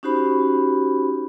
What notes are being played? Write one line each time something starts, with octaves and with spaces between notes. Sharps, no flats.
C#4 D#4 F#4 G4 C5 B5